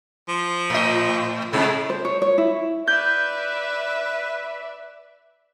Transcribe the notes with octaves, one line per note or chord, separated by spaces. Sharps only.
F3
A2 D#5
A2 C3 G#3
C5
C#5
C#5
E4
B4 D5 E5 G6